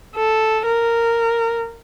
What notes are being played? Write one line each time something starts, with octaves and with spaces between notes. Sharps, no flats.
A4
A#4